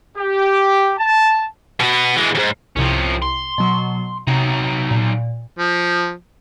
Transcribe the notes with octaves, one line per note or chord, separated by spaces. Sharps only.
G4
A5
B2 B3
E3 G#3
D#2 G#2
C2 C3 F3 C#4
C6
B2 F#3 C#6
C3 F#3 D#4
A#2
F3